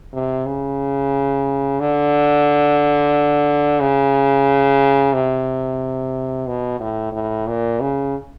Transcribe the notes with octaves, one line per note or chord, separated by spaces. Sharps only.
C3
C#3
D3
C#3
C3
B2
A2
A2
A#2
C#3